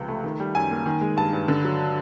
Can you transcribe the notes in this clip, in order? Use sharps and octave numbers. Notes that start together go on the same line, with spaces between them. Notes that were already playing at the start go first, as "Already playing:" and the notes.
Already playing: C#2 C3 F3
A3
D#3
G3
F#2 G#5
A#3
D#3
G#3
G2 A5
G2
D3
F#3